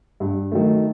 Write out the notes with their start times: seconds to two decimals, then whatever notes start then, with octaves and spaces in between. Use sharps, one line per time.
0.20 G2
0.52 D#3 F#3 A3